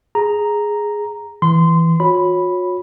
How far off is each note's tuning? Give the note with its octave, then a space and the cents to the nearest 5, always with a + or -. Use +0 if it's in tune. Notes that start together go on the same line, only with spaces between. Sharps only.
G#4 +0 A#5 +0
E3 +0 C6 -20
F#4 -40 C#5 -5 B5 +0